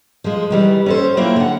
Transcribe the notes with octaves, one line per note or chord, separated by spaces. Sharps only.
F3 G#3
D#3 E3 G3
C#4 A4 C5
F#3 A#3 C4 E4 F4
D3 F#5